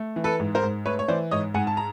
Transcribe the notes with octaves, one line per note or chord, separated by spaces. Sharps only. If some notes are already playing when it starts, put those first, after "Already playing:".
Already playing: A3
E3
A4 B4
G#2
A#4 C5
G#2
A3 B4 C#5
C#5
E3 C5 D5
G#2 C#5 D#5
G#2 F#5 G#5
A5
A#5